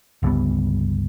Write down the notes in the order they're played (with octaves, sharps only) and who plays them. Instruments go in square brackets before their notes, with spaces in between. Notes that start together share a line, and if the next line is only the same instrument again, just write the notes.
[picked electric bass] G1 C#2 G3 B3